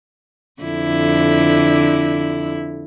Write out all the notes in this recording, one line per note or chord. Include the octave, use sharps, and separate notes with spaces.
F2 D3 E4